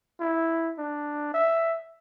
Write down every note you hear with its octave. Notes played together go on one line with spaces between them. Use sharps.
E4
D4
E5